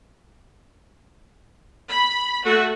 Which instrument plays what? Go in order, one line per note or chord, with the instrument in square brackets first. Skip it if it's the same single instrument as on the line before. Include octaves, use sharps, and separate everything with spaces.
[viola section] B5
A3 F#4